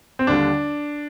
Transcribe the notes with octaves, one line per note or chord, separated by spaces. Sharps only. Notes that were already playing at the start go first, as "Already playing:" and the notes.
C4
D#2 D3 G3 D4